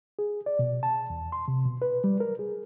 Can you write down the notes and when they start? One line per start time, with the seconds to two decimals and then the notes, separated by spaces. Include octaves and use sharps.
0.19 G#4
0.46 D5
0.59 B2
0.83 A5
1.10 E2
1.32 C6
1.48 C3
1.66 B2
1.82 B4
2.04 G3
2.20 A#4
2.39 G#4